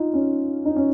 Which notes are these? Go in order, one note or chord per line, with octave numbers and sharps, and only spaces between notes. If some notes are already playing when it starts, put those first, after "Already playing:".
Already playing: D#4 F4
C#4
D#4
C#4